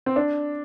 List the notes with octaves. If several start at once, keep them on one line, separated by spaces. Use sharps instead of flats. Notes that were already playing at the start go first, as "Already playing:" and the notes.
C4
D4